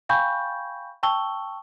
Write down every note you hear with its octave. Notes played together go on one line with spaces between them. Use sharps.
F5 G5 G#5 B5 C#6 G6
G5 A5 C#6 E6 G7